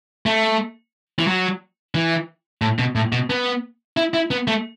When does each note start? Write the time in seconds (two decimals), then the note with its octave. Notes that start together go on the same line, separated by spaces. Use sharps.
0.26 A3
1.19 E3
1.27 F#3
1.95 E3
2.62 A2
2.79 B2
2.95 A2
3.12 B2
3.30 B3
3.97 E4
4.14 E4
4.31 B3
4.47 A3